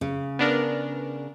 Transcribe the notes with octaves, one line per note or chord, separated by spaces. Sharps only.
C#3
B3 D4 A#4